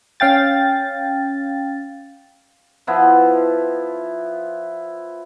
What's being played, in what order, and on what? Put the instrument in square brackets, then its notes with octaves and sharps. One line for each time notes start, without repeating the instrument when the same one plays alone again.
[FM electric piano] C#4 F5 G5 A6
[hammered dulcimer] F3 B3 E4